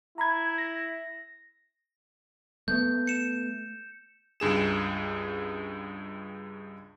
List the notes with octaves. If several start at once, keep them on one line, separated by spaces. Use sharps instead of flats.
E4 A#5 B5 G#6
A#6
A3 B3 G6
C#7 E7
C#2 G2 G#4 E7